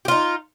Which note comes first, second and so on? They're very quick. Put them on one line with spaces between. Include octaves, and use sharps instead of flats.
G4 F4 D#4